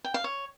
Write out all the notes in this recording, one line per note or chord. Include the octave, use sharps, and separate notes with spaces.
G5
F5
C#5